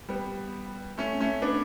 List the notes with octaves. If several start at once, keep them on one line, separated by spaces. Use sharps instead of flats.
G3 B3
A3 C#4
A3 C#4
B3 D4